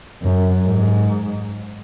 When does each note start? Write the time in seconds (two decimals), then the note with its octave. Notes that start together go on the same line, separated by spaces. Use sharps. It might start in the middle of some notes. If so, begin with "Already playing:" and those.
0.23 F#2
0.67 G#2